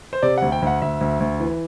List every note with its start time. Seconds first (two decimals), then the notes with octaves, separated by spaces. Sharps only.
0.13 C5
0.22 C3 D5
0.38 D2 F#5
0.52 G5
0.62 D2 F#5
0.82 D2 E5
1.01 D2
1.20 D2
1.40 E3